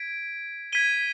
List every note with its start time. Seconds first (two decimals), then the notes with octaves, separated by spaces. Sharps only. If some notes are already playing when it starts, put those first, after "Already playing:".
Already playing: G#6 B6 D7
0.72 G#6 B6 D#7 G7